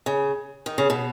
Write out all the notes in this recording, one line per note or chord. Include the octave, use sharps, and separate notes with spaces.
C#3
D#3
C#3
B2